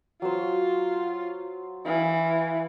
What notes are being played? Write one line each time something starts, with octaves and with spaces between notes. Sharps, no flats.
F#3 F4 C5
E3 F5 G#5